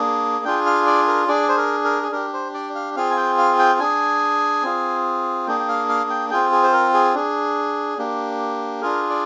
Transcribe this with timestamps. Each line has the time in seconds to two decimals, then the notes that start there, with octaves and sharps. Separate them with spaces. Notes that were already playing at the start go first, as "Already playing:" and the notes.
Already playing: A#3 D4 G#4
0.45 D4 F4 G#4 G5
0.66 F5
0.86 D5
1.07 A#4
1.28 D4 G#4 D5
1.48 C5
1.57 A#4
1.84 A#4
2.03 G#4
2.12 D4 G4 A#4
2.33 C5
2.54 D5
2.75 F5
2.96 C4 F4 G#4 F5
3.11 G#5
3.17 G5
3.38 F5
3.59 G5
3.80 D4 G#4 G#5
4.63 C4 F4 G#4
5.47 A#3 D4 G#4 G5
5.59 G5
5.68 F5
5.89 F5
6.10 G5
6.31 C4 F4 G#4 G5
6.52 G#4
6.63 C5
6.73 A#4
6.94 G#4
7.14 D4 G#4
7.98 A#3 D4 G4
8.82 D4 F4 G#4 A#4
9.10 D5